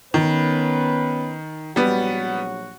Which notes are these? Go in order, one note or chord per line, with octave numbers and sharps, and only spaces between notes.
D#3 B3 C#4 B4
A#1 F#3 G3 B3 F#4